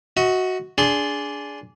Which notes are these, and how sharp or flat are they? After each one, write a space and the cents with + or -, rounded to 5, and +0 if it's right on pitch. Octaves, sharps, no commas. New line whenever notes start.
F#4 +0 D#5 +45
D4 -15 G#4 +0 C6 +0